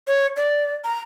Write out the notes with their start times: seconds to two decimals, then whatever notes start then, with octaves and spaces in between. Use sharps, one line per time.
0.07 C#5
0.37 D5
0.84 A#5